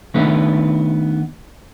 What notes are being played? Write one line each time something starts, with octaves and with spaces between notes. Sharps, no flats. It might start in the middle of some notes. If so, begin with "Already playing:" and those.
D#3 A3 B3 D4 D#4 B4